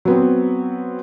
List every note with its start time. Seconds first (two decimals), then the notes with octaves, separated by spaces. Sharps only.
0.05 F#3 B3 C4